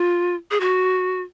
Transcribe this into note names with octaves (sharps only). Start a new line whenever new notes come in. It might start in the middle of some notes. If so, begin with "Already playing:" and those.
Already playing: F4
G#4
F#4